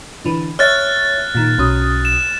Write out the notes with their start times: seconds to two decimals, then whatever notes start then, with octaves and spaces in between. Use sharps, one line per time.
0.25 D3 E3 D4
0.59 C#5 E5 F6 F#6 A6
1.35 A#2 D#3
1.58 B1 C#4 D#6
2.05 E7